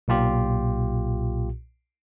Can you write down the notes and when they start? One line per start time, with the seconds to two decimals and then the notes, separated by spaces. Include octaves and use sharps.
0.08 B1 A#2 F4 G4